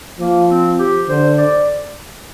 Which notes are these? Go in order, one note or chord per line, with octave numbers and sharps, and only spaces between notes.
F3 A#3
C4
G4
D3 C5
D5